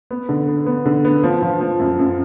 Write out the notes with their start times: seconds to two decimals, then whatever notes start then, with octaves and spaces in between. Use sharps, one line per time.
0.11 B3
0.29 D3
0.48 B3
0.66 B3
0.86 D3
1.05 B3
1.24 F3
1.42 F3
1.61 F3
1.80 F#2
1.99 F#2